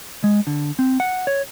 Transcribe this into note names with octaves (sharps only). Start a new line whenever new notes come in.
G#3
D3
C4
F#5
C#5